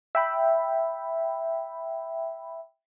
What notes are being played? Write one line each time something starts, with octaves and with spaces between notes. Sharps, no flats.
E5 G5 B5